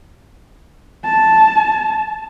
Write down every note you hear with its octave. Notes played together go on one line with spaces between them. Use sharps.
A5